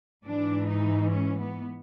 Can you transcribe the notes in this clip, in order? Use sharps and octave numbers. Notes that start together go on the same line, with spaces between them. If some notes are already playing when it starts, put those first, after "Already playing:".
G#2 E3 D4
D#4
C#4
B3